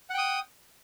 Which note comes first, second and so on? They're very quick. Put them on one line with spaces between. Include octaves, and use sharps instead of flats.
F#5 G5 D#6